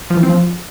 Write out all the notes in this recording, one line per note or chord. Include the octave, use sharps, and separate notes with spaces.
F3
E3
C4
F3